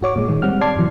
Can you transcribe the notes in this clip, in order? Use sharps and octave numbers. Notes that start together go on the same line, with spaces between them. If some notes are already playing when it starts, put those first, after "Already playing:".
G#2 F#4 C#5 D6
A#2 G#3
D#3 G#3
G3 C4 F#5 F6
D5 A5 C6 D6 G#6 C7
G#2 B2 E3 F#3